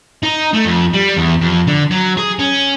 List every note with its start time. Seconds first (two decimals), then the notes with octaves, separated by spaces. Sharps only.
0.23 D#4
0.53 A3
0.65 F2
0.93 G3
1.17 E2
1.42 F2
1.67 D3
1.91 F#3
2.17 G#4
2.39 C#4